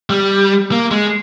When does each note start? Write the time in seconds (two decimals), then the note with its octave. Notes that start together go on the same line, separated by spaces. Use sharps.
0.10 G3
0.71 A#3
0.91 G#3